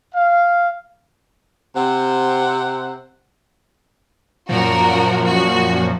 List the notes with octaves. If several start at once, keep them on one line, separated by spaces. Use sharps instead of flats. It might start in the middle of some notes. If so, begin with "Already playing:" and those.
F5
C3 C4 F#5
F#2 A#2 F3 F#4 A#4
F#4